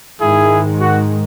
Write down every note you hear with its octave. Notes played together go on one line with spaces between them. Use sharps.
G#2 D#3 G#3 E4 G#4
F#4